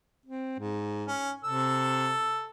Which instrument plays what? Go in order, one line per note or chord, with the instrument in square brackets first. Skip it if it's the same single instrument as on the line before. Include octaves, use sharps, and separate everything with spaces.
[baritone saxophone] C4
G#2
[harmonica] C#4
[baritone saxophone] C3 [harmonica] A4 E6